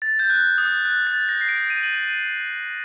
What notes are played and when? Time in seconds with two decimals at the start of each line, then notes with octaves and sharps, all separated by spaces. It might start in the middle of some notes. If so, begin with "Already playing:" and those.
0.02 A6
0.19 G6
0.30 F#6
0.58 D#6
0.85 F#6
1.07 A6
1.29 A#6
1.41 C7
1.49 D7
1.70 D#7
1.83 F#7
1.96 D#7